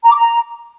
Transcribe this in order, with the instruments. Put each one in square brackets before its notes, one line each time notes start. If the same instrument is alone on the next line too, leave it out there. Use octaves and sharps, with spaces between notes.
[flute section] A#5
D6
A#5